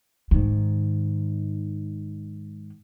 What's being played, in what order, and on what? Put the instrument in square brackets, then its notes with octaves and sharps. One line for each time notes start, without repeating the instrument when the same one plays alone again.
[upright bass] G#2 D#3